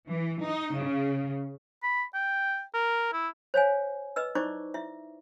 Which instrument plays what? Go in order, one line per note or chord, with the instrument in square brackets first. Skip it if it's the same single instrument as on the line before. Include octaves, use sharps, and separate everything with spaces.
[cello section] E3
D#4
C#3
[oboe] B5
G5
A#4
E4
[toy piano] C5 C#5 F5 G#5
B4 D#5 E6
D#4 E4 C5 D5 C#6 D6
E4 E5